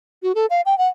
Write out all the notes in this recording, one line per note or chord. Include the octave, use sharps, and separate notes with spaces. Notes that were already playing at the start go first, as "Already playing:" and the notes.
F#4
A4
F5
G5
F#5